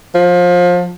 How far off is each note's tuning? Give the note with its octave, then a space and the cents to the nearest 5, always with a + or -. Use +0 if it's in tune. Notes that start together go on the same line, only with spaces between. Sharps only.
F3 +25